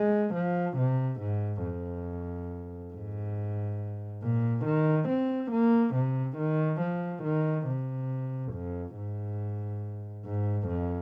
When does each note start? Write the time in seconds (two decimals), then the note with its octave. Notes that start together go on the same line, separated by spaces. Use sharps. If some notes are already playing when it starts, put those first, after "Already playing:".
Already playing: G#3
0.35 F3
0.78 C3
1.21 G#2
1.64 F2
2.93 G#2
4.22 A#2
4.65 D#3
5.09 C4
5.52 A#3
5.95 C3
6.38 D#3
6.81 F3
7.24 D#3
7.67 C3
8.53 F2
8.96 G#2
10.26 G#2
10.68 F2